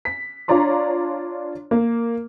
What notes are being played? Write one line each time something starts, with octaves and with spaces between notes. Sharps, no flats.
B6
D4 F4 C#5 D5 A#5 C6
A#3